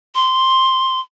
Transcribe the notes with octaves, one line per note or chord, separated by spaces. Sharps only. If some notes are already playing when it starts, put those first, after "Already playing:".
C6